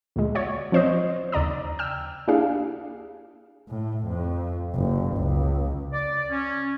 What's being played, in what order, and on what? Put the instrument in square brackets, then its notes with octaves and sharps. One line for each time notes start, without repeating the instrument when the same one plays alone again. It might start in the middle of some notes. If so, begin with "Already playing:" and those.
[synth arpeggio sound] D2 A#2 G#3
F#4 C#5 D5
F3 C4 C5 C#5 D#5
D#2 C#3 D5 A#5 D#6
G5 E6 F6
A#3 D4 E4 G4 G#4 F5
[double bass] A2
F2
F#1
C#2
[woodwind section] D5
C#4